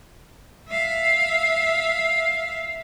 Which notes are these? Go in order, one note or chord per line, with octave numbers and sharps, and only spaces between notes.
E5 F5